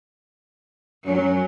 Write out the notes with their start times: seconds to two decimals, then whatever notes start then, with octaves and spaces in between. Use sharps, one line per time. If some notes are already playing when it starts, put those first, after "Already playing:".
1.05 F#2 F#3 C#4